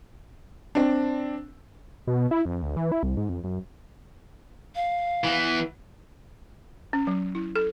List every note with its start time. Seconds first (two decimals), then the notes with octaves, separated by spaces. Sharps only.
0.75 C4 D4
2.07 B2
2.31 E4
2.45 F2
2.62 D2
2.77 E3
2.92 E4
3.03 C2
3.17 G#2
3.29 F2
3.44 F#2
4.75 F5
5.24 E3 B3
6.93 C#4
7.07 F#3
7.35 E4
7.56 A4